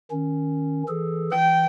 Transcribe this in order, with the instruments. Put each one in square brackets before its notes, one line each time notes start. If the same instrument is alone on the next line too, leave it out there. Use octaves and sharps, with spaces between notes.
[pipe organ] D#3 C#4
E3 G#4 A4
[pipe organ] E3 [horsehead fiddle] G5